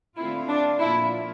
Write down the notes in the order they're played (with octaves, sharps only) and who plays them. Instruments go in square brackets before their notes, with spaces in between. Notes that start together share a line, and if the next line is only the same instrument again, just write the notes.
[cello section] D3 A3 C4 F4 [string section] E4
[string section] D4
[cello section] A#2 F3 A#3 F4 [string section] E4